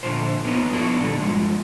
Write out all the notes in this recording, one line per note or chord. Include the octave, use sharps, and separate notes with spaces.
A#2 D3 D#3 F3 C5
A#3 B3 C#4 D#4 F4
F3 B3 D4 E4 F#4 A4
A#2 D3 G3
G2 C#3 F3 G#3